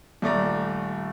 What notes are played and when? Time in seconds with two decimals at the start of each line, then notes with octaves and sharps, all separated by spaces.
0.22 D#1 A3 D5 A#5